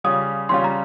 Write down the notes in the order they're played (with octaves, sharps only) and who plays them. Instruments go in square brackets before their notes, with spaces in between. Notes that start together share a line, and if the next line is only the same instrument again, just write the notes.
[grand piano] C#3 G3 C#4 F4 [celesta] D#6
[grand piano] C#3 G3 C#4 F4 [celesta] C6
[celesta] A#5